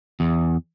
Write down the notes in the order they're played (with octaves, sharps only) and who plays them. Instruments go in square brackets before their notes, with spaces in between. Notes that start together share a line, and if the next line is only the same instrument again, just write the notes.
[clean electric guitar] E2